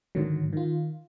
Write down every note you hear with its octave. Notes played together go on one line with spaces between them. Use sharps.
G#2 D3 D#3 F#3
D#3 F4